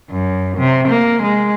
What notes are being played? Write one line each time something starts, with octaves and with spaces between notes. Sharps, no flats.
F#2
C3
A#3
G#3